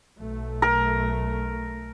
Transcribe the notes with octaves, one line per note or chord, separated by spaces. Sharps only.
B1 A3
A#4